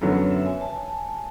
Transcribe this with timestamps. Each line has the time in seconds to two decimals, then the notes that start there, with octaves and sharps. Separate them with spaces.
0.01 F#2 D3 F#3 B3 C#5
0.10 B4
0.18 C#5
0.31 E5
0.46 G#5
0.61 A5
0.76 G#5